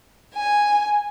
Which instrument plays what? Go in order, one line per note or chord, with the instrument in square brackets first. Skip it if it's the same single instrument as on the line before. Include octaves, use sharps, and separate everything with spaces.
[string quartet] G#5